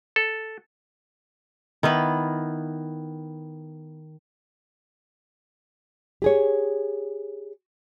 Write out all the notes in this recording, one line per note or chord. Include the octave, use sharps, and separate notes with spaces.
A4
D#3 B3 E4 B4
G4 G#4 C#5